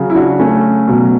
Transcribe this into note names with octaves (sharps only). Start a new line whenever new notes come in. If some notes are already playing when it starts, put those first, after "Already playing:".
Already playing: C#3 F#3
E4
D4 F#4
A3 C#4
B2 F#3